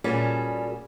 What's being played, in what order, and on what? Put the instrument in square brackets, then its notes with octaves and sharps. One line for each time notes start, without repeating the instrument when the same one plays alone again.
[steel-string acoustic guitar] A#2 G3 C#4 F#4 G#4 A4